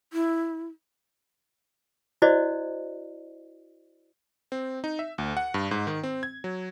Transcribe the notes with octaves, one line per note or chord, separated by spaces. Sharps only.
E4
E4 F#4 C5 D5 D#5
C4
D#4
E5
D2
F#5
G2
G#2
D#3
C4
G#6
F#3